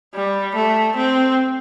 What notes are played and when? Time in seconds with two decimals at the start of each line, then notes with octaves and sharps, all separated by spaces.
0.15 G3
0.56 A3
0.97 C4